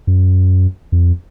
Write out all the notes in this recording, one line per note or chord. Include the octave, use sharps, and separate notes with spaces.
F#2
F2